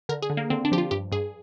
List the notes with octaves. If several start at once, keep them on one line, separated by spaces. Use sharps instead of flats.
D3 A#4
G#4
D3
A#3
D3 C4
D4
F3 G4
F4
G2 G4
G2 G#4